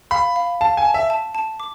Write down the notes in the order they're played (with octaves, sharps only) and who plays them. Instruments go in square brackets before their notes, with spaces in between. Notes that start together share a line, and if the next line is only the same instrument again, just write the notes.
[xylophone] F5 [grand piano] B5
[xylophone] F5
[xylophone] F5 [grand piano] A5
[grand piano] G#5
[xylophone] A5
[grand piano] E5
[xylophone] A5
A5
D6